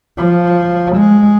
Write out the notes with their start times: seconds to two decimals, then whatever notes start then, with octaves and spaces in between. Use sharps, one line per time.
0.18 F3
0.96 G#3